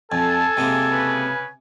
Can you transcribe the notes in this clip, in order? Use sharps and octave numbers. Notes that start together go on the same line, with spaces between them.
F2 A4 G#5 A5
C3 G#3 A#3
C#3 B4